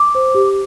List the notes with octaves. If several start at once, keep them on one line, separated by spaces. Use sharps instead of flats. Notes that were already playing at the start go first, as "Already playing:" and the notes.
Already playing: D6
C5
G4